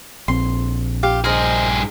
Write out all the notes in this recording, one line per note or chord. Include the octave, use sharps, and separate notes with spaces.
A#1 C4 C6
F4 G4 F5
G2 G#4 A#4 C5 D#5